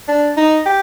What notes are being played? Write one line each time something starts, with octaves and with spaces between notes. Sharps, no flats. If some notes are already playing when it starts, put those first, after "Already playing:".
D4
D#4
G4